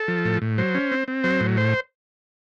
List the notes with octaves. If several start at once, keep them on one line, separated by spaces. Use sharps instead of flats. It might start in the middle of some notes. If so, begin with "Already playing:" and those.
Already playing: A4
F3
A2
A2
F#3 C5
C#4
C4
C4
F#3 C5
A2
C5